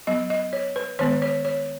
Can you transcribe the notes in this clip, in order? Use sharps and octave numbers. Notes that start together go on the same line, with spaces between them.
F#3 B3 D#5
D#5
C#5
B4
D#3 G#3 B3 C#5
C#5
C#5